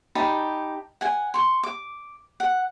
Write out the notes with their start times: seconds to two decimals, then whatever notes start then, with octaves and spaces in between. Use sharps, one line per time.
0.15 D#4 G4 A5 B5
1.01 F#5 G#5
1.34 C6 C#6
1.63 D6
2.40 F#5